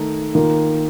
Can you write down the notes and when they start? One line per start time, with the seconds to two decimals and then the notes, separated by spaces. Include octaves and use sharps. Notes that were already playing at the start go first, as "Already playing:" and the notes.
Already playing: D#3 A3 D#4
0.35 D#3 A#3 F4